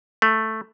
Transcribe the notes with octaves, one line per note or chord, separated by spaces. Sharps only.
A3